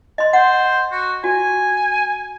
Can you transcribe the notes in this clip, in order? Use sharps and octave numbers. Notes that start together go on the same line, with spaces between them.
D#5 C6
C5 F#5
F#4
F#4 G#5